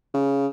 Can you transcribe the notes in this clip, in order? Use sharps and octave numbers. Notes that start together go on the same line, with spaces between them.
C#3